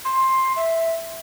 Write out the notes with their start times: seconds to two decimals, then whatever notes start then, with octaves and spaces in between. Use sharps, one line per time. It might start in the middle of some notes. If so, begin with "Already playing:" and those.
0.05 C6
0.56 E5